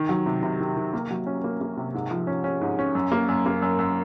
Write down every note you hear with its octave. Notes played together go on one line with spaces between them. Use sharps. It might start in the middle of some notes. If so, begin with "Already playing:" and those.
Already playing: D#3
F#3
C3
C3
D#3
D#3
A#3
F#3
C#4
A#3
A#3
C3
G#2
F3
C#4
C#4
G#2
C#4
F#2
A#3
F#2
A#3
F#2
F#2